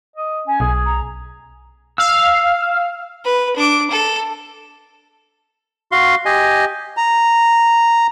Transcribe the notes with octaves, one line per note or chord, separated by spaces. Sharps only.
D#5
C#4 G#5
B1 G#4
A#5
F5 E6
B4
D4 D6
A4
F#4 F5 C6
G4 D#5 G#5
A#5